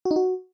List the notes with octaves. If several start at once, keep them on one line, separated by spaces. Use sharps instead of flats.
F#4
D#4
F#4